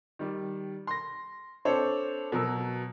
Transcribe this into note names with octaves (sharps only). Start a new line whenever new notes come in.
D#3 G3
C6 A#6
C4 D4 A4 C5 C#5
B2 F#3 A#4 E6